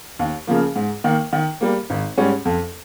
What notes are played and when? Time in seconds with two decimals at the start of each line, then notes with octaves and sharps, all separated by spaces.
0.19 D#2
0.47 C#3 F3 A#3
0.76 G#2
1.04 D#3 A#3
1.33 D#3
1.61 G3 A#3
1.90 G#1
2.18 G#2 G3 C#4
2.45 F2